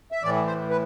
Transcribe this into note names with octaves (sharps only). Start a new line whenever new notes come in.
E5
A2 E3 D5
C5
B4